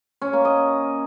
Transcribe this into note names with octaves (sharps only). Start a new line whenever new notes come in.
C#4
A#3
D#5